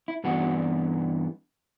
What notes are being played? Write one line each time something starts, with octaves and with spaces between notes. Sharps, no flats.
E4
G2 E3 B3 D4 F#4